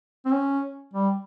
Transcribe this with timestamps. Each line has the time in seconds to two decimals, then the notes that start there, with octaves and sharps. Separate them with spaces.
0.25 C4
0.32 C#4
0.94 G3